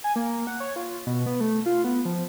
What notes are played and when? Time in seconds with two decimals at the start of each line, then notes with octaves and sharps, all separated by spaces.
0.04 G#5
0.16 A#3
0.47 F#5
0.60 C#5
0.76 F4
1.06 B2
1.26 B3
1.40 A3
1.66 F4
1.84 B3
2.05 F3